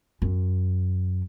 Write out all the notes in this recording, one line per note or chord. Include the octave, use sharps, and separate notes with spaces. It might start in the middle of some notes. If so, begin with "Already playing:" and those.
F#2